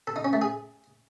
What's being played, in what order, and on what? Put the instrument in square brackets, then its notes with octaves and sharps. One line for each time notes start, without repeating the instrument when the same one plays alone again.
[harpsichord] A4
D#4
C#4
A3
G#4